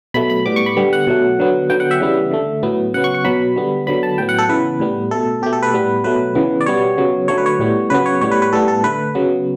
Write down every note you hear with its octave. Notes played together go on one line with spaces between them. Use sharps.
B2 F#3 A3 B5
B5
A2 G3 B3 D6
C#6
B5
D3 G3 B3
F#5
B2 F#3 A3
D3 F#3 B3
D3 F#3 B3 G5
F#5
E5
C#3 E3 G3 B3
D3 A3
A2 F#3 B3
C#3 F#3 B3 F#5
C#6
C#6
B2 F#3 B3 B5
D3 G3 B3
D3 F#3 B3 B5
A5
A2 F#3 B3 G5
F#5
A4
C#3 E3 B3 B4
A2 G3 B3
B2 A3 A4
B2 A3 G4
A4
B4
A2 G3 B3
B2 F#3 A3 B4
C#3 E3 B3
D5
B2 G3 B3 C#5
C#3 F#3 B3
D3 F#3 A3 C#5
B4
C#5
A2 G3 B3
C#3 F#3 B3 B4
C#5
A2 G3 B3 C#5
B4
B4
A2 G3 B3 A4
A4
D3 A3 B4
C#3 F#3 B3